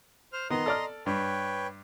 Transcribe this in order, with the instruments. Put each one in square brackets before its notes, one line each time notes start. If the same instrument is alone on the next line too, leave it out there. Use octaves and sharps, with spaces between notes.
[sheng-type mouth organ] C5 F6
[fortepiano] D#3 B3 [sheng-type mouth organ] D#5 A#5 C6
[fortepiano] A4 D5 F6
[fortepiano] G2 [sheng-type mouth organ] B4 C#5 G5